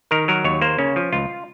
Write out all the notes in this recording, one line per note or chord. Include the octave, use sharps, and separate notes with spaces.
D#3 A#4
F#3 A#4
D#2 C#5
A#3 C5
C#3 C#4
F3
C#2 F4